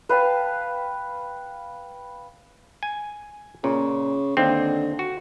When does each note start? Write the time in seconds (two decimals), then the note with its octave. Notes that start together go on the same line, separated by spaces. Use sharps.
0.09 B4 F5 G5 A5
2.83 G#5
3.64 A#2 C#3
4.37 D#2 D3 C4
4.99 F#4